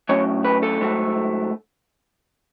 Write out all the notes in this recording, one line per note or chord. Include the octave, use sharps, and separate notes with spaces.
A2 F#3 C#4 C#5
B4
A4
G#2 F#3 A3